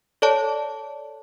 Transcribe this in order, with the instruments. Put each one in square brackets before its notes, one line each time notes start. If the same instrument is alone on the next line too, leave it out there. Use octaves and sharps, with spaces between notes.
[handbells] A4 C#5 D5 A5